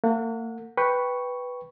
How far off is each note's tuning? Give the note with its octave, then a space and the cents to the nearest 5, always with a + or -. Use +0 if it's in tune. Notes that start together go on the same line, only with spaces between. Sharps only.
A#3 -45 F#5 -25
B4 +0 G5 +0 C#6 +0